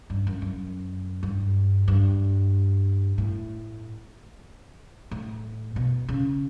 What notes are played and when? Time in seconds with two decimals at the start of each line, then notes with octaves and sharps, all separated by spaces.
0.10 G2
0.27 F#2
0.42 F#2
1.23 G2
1.88 G2
3.18 A2
5.11 A2
5.76 B2
6.09 C#3